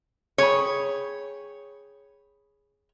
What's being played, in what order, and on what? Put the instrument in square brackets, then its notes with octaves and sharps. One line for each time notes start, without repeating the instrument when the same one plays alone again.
[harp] G#4 G5 B5 [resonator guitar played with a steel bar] C#5